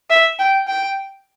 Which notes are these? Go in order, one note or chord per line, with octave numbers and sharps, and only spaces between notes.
E5
G5
G5